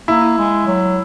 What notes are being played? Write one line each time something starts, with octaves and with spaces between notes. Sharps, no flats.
A#3 E4
G#3
F#3